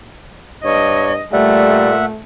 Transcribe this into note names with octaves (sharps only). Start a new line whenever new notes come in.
G2 C#5 D#5
A#2 G3 A3 E5 F#5